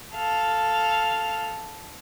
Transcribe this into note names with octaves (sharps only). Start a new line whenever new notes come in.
A4 F5